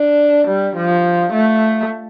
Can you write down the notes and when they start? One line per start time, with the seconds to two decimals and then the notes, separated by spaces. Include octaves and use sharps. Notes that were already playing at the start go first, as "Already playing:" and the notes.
Already playing: D4
0.47 G3
0.76 F3
1.33 A3